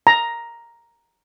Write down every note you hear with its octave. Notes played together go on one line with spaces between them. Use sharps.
A#5